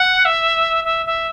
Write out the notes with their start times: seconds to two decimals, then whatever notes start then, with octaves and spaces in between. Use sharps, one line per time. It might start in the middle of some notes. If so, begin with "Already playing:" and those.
Already playing: F#5
0.25 E5
0.85 E5
1.06 E5